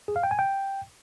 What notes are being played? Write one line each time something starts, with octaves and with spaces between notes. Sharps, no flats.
G#4
F5
G5
G#5
G5